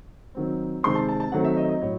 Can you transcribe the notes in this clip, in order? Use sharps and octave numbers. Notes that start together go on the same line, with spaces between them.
D#3 F#3 C4
C3 D#3 G#3 C4 C6
A5
A5
A5
D#3 F#3 A3 C4 F#5
E5
D#5
D#5
A2 F#3 C#5